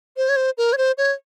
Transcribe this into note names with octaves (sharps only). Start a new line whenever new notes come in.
C5
C#5
C5
A#4
C#5
C5
C#5